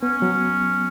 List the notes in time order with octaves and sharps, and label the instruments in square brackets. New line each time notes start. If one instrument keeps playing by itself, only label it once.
[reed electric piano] B3 [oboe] C#4
[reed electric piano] F#3